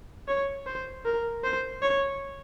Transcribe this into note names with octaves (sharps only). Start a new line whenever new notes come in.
C#5
C5
A#4
C5
C#5